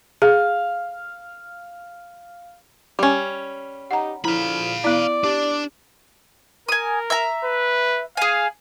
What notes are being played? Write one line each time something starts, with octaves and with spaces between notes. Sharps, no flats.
G#4 F5
G3 C#4 G4
D#4 G4 F#5 A#5
D3 F3 E4 F5 B5
B3 E4 D5
D4 G4
A#4 G#5 D#6
E5 A#5
B4
G#4 F5 G#5